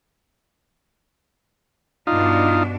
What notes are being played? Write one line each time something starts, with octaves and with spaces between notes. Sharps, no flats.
G2 B2 D4 D#4 F4